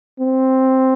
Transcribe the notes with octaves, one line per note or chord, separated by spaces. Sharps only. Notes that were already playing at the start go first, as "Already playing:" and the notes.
C4